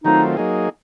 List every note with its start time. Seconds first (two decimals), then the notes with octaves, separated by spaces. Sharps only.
0.04 D#3 F#3 A3 C4 D#4 F4
0.37 F#3 A#3 D#4 G#4